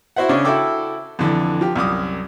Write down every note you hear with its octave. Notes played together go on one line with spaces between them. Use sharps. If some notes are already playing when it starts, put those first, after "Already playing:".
E4 F#4 C5 E5 F#5
C#3 C#4 D4
E4 F#4 A4 G5 D6 E6
F2 D3 E3
F3 G4
C2 F#2 D6 D#6